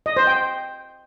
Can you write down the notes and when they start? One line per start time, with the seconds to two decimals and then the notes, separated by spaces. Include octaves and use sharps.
0.06 D#5
0.17 C5
0.27 G5